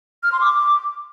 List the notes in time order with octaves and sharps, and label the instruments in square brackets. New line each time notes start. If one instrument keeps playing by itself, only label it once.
[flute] F6
C6
D6